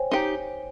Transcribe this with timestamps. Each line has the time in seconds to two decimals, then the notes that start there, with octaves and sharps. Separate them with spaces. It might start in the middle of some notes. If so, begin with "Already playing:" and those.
Already playing: C5 C#5 G5 G#5
0.11 D#4 G4